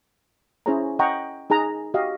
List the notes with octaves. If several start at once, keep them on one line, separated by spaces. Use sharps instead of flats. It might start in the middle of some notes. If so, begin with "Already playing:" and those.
C#4 E4 G#4 C5 C#5 A#5
D#5 F#5 G5 A#5 C#6
D#4 G#4 G#5 A#5
F#4 G4 D#5 F5 G5